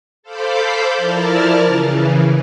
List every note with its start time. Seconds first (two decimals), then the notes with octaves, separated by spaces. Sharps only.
0.23 A4 C5 F5 B5 D6 G6
0.97 F3 E4 A#4 D5 A5 F6
1.64 C#3 E3